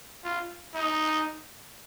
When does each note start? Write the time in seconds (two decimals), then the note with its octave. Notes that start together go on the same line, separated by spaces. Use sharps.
0.24 F4
0.74 D#4